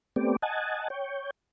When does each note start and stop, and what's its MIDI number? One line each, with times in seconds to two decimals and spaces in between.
0.16 0.36 57
0.16 0.36 59
0.16 0.36 60
0.16 0.36 67
0.16 0.36 74
0.42 0.88 75
0.42 0.88 78
0.42 0.88 80
0.42 0.88 81
0.90 1.30 73
0.90 1.30 79